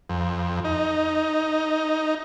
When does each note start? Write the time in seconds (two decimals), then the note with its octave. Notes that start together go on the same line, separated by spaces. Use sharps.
0.10 F2
0.64 D#4